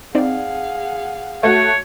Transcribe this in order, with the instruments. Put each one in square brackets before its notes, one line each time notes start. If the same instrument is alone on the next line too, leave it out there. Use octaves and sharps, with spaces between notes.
[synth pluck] C4 D#4 D5 [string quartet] G#4 F5 F#5
[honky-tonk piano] A3 F#4 [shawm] C#5